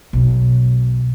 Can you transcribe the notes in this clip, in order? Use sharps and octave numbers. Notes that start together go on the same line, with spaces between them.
B1